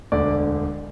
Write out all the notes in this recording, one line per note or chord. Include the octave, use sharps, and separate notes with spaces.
E1 D2 D3 D5